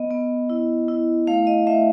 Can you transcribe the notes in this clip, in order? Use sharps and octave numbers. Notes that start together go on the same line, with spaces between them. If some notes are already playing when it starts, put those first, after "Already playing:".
Already playing: B3 D#5
B3
E4
E4
A3 F5
D#5
A3 E5